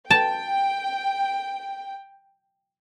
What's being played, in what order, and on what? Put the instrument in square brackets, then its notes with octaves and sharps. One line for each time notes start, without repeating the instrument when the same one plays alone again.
[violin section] G5 [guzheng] A5